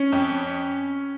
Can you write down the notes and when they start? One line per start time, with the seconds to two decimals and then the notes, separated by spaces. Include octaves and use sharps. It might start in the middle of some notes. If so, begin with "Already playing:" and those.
Already playing: C#4
0.12 F2